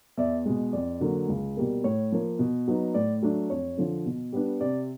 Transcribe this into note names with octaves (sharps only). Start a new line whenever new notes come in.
E2 D5 E5
B2 G#3
F2 D5
D3 F#3 A#3
C#2
B2 G3 A#3
A2 C#5
F3 A#3
B2
F#3 B3 D#4
A2 D5
F#3 A3 D4
F2 C#5
D3 F3
B2
G3 B3 D4
C3 D5